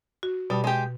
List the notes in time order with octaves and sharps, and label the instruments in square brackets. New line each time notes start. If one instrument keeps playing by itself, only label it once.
[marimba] F#4
[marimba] B2 A5 [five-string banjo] G3
[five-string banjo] G#3 G4